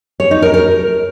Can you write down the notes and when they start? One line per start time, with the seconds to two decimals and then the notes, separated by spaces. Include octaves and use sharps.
0.20 C#5
0.31 D#4
0.42 A#4
0.54 A#4